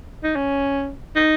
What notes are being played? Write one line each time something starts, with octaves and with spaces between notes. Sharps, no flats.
D#4
C#4
D#4